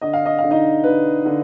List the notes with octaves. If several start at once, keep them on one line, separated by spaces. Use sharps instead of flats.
D3 D#5
F5
D#5
D3 F5
D#4 D#5
D3 B4
D3